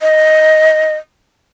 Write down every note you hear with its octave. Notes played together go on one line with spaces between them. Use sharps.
D#5